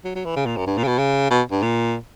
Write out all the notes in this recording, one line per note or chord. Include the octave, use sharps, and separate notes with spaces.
F#3
F#3
E3
C#3
A#2
F#2
G2
A#2
C#3
B2
C#3
B2
G2
A#2